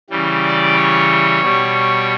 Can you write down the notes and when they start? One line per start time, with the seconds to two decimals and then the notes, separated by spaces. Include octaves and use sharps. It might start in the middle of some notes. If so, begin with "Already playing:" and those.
0.10 C#3 E3 G3
0.43 D5
0.75 C#5
1.41 B2 G3